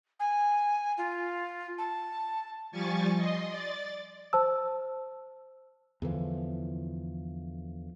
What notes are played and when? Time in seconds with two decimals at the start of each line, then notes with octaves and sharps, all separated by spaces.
0.19 G#5
0.98 F4
1.78 A5
2.72 F3 G3 G#5 C#6 A6
3.16 D#5 C6
3.48 D5 A6
4.33 C5 A5 E6
6.02 E2 D3 E3 F3